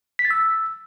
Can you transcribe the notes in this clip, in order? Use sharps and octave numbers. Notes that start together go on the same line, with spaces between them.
B6
A6
E6